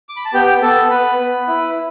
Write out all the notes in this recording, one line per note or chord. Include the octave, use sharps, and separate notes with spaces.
D6
B5
A5
B3 G4 G5
B3 A4 A5
B3 B4 B5
B3
E4